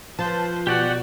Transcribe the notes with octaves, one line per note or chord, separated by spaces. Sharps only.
F3 B4 C5 A5
B2 F#4 G4 D5 F#5